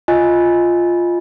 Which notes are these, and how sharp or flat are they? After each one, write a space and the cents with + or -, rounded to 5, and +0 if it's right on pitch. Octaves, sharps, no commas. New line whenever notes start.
F4 +0 D#5 +5 G#5 +0